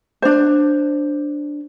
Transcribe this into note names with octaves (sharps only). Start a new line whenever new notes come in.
D4 C5